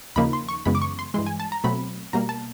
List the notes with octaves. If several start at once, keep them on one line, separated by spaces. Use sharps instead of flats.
D#2 C#3 F3 A#3 D#4 B5
C6
C#6
F#2 C#3 E3 G#3 B3 B5
D6
C#6
C6
G2 E3 G#3 C6
G#5
A5
A#5
B2 F#3 A3 C4 B5
B2 G3 A#3 A#5
A5